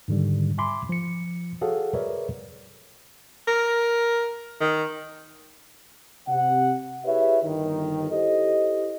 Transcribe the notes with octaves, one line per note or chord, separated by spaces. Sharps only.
G#2 D3 D#3 G3
E5 G#5 B5 C6 D6
F3 C#7
F#4 G#4 A4 C#5 F5 F#5
G#4 A#4 B4 C#5 D5 E5
A#4
D#3
C3 F#5
E4 G4 G#4 B4 C#5 E5
G1 D#3
E4 G4 A4 C5 D#5